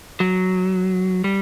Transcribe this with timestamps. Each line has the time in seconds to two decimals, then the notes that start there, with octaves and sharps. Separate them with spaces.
0.20 F#3
1.24 G3